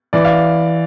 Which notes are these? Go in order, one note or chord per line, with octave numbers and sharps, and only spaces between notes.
E3 D5
F5